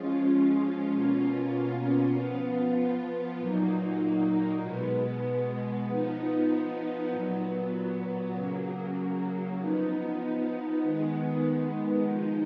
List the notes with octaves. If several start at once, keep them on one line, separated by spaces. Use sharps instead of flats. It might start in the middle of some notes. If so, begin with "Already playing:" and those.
Already playing: F3 G#3 C#4 F4
B2 A#3 C#4 F4
F3 B3 F4
A#2 F#3 A#3 D#4
B2 G#3 B3
F3 B3 D#4
A#2 F#3 B3
C#3 F#3 A#3
F3 B3 D#4
D#3 G#3 B3
F3 G#3 D#4